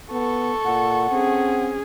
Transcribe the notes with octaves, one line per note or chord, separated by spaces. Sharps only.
B3 A4 C#6
A#2 F#5
C4 C#4 G#4